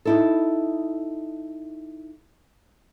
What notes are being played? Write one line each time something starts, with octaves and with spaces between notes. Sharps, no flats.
D#4 E4 A4